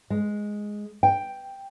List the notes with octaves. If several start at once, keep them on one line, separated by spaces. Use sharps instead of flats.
G#3
G5